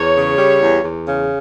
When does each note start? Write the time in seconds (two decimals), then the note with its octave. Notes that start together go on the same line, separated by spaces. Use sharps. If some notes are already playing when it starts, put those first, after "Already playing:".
Already playing: E2 C#5
0.16 C#3
0.38 G3
0.60 E2
0.83 E2
1.05 C#3